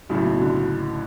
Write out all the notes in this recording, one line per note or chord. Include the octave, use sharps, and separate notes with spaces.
B1 A2 C#3 F#3
B2
D3